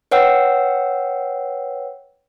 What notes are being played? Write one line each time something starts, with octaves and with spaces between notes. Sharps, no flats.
B4 C#5 F#5 G5 E6